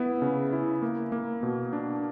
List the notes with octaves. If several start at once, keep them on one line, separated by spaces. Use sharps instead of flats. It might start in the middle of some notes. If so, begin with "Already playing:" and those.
Already playing: B3 E4
C#3
E4
A#3
A#3
B2
D4